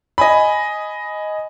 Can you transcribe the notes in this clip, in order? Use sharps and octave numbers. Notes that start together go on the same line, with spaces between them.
D#5 G#5 B5